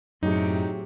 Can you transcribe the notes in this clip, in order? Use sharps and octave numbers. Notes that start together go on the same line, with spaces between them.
F#2 A2 C3 F#3 D#4 G4 G#4